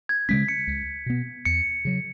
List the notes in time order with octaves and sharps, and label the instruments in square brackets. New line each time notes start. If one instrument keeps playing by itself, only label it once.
[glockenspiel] G#6
[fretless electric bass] C#3 G#3 C#4 [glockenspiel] B6
[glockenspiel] C#7
[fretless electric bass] C#2
B2 B3
[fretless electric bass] E2 [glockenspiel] C#7
[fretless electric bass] C#3 F#3